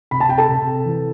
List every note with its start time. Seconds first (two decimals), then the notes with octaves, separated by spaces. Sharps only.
0.11 C3 B5
0.20 A5
0.29 G5
0.38 A4 A5
0.49 C3
0.85 E3